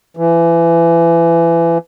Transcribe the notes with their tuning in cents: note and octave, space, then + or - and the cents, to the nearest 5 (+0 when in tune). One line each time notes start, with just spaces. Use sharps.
E3 +25